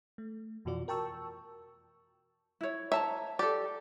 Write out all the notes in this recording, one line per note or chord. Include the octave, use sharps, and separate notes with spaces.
A3
F2 B2 E3 F4 F#4 D5
A#4 G5 A5 C#6 E6
E4 C#5
C#5 E5 A5 A#5
G4 A4 D5